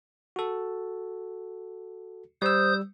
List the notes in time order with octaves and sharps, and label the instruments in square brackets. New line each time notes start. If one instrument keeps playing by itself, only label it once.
[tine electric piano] F#4 A4
[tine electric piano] G3 E6 [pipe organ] C5 D#6 G6